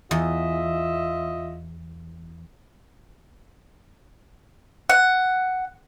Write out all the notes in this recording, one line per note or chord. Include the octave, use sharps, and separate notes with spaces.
E2 F4 D#5 E5
F#5